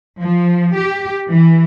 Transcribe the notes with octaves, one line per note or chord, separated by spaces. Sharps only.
F3
G4
E3